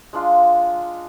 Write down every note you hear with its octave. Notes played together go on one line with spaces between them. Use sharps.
G#3 D4 F4